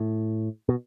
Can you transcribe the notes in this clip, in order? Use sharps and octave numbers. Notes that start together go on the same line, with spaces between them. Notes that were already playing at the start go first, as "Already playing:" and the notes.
Already playing: A2
B2